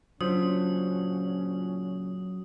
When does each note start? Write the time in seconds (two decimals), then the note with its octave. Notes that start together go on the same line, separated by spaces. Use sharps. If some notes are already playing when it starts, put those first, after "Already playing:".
0.21 A#2 C#3 F#3 C#4 D4 F4 C5 D#6